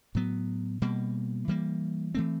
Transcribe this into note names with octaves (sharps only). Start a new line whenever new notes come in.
A2 F#3 B3
B2 G3 A#3
E3 G3 A#3
E3 A3 C4